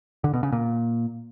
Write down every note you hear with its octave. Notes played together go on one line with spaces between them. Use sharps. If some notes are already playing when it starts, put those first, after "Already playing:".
D3
B2
C#3
A#2